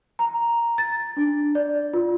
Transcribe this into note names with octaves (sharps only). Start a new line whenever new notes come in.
A#5
A6
D4
D5
F4